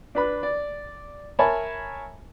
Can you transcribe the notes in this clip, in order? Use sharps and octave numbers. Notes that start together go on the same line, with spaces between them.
D4 B4 B5
D5
A#4 C#5 E5 G#5 A5 B5